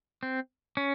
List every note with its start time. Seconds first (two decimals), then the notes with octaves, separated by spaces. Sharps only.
0.23 C4
0.77 C#4